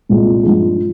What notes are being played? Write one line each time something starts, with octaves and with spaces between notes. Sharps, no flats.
C2 A#2 G#3
G2 F3 G#3